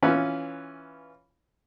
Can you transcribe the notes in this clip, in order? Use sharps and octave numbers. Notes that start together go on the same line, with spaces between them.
E3 C#4 F4 B4